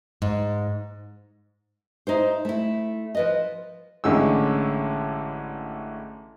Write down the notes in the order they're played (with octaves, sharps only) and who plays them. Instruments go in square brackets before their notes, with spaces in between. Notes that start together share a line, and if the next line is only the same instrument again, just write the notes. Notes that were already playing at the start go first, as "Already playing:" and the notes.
[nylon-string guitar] G#2
D#4 E4 C5
A3 E4
F3 B4 D#5
[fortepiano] A1 D3 G#3 C#4 E6